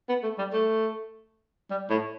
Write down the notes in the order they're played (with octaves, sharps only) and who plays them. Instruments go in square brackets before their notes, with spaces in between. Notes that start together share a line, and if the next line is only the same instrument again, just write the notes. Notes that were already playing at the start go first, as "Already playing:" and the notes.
[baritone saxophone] B3
A3
G3
A3
G3
A2